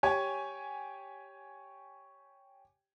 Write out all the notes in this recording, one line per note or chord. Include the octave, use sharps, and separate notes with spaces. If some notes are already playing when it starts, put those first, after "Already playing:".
G4 C#5 G#5